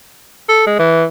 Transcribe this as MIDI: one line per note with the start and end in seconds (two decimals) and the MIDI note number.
0.49 0.63 69
0.67 0.76 56
0.79 1.04 52